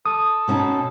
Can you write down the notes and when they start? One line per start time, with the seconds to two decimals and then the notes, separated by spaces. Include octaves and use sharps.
0.06 A4 D#6
0.48 B2 C#4 D#4